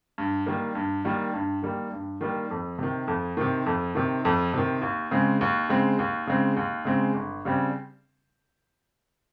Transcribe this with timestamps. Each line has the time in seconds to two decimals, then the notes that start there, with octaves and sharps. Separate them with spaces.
0.18 G2
0.46 D#3 G3 A#3
0.75 G2
1.05 D#3 G3 A#3
1.34 G2
1.62 D#3 G3 A#3
1.92 G2
2.21 D#3 G3 A#3
2.51 F2
2.79 C3 D#3
3.08 F2
3.37 C3 D#3
3.66 F2
3.95 C3 D#3
4.25 F2
4.54 C3 D#3
4.82 D#2
5.11 C#3 G#3 C4
5.41 D#2
5.69 C#3 G#3 C4
5.99 D#2
6.27 C#3 G#3 C4
6.57 D#2
6.85 C#3 G#3 C4
7.14 G1
7.45 C#3 G3 C4